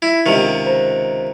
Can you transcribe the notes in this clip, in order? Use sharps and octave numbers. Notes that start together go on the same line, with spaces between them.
E4
C#2 C3 D#3
C5 A#5